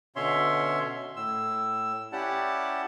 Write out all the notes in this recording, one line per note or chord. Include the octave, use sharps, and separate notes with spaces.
B2 D3 C#4 C#5 E5 C6
A2 E6
C#4 E4 G4 D5 F#5 A5